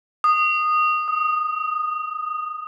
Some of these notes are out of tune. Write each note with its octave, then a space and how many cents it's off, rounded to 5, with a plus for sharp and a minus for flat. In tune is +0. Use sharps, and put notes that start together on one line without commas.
D#6 -15
D#6 +20